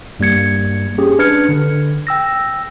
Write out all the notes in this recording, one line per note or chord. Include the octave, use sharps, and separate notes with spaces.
G2 G3 A#3 G#6 C#7
C#4 G4 G#4
D4 B4 F6 G#6 C#7
D3
G5 E6 A#6